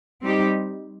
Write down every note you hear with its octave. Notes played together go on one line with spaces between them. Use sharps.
G3 C4 D#4 G4